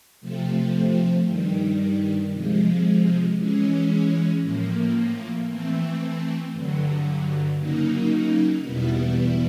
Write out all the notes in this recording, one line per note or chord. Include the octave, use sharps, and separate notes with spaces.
C3 F3 A3 C4
G2 D#3 G3
C3 F3 G#3
E3 G#3 C#4
A2 F3 A#3
E3 A3 C4
G2 D3 F#3
C#3 F#3 A#3 D#4
E2 B2 G3 B3 E4